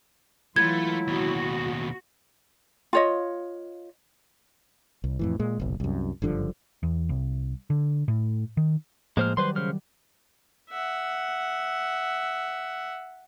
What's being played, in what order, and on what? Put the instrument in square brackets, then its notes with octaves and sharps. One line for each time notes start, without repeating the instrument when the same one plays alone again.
[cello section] E3 G#3 F4 [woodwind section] F#3 E4 [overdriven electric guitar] A3 [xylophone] G#6
[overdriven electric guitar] D#2 B2 [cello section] F#4
[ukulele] F4 C#5 D#5
[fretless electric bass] C2
F2 A2 E3
A#2 G#3
F#1 B1
C2 F#2
F#1 G2 D3 F3
[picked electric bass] E2
C2
D3
A2
D#3
[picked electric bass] A2 F3 A#3 [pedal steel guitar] G#3 C5 F6
[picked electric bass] D#3 F#3 G3 [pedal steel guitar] B4 C5 C6
[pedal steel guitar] C#3 C5 F6
[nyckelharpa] E5 F#5